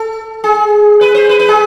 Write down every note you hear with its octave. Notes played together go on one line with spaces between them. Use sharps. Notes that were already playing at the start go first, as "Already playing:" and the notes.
Already playing: A4
G#4
B4
C5
B4
B4
G#4